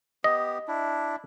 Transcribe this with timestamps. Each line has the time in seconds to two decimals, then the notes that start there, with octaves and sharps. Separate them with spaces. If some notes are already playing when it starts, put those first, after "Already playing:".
0.24 B3 G4 D#5
0.68 D4 E4